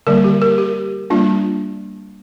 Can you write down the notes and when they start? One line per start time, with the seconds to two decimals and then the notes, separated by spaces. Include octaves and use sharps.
0.07 D3 G3 A#3 A#4
0.24 G4
0.41 A#4
0.58 G4
1.10 G3 A#3 D4 F4